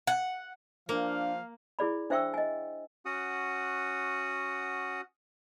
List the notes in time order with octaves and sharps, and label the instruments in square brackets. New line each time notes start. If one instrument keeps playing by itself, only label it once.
[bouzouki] F#5
[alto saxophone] F3 [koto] A#3 [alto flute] D4 [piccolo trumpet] F5
[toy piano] E4 G#4 D5 B5
D4 C5 E5 G5 C#6 E6
D#5 G#5
[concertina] C#4 F#4 F#5 D#6